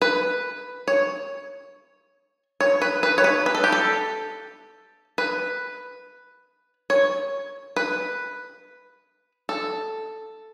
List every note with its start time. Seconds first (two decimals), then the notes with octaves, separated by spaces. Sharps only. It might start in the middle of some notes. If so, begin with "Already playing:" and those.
0.02 B4
0.88 C#5
2.60 C#5
2.82 B4
3.03 B4
3.18 C#5
3.24 B4
3.46 B4
3.55 A4
3.64 G4
3.72 A4
5.18 B4
6.90 C#5
7.76 B4
9.49 A4